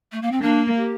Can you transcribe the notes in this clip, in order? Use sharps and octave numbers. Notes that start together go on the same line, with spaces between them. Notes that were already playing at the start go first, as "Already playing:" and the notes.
A3
A#3
C4
A#3 D4
G4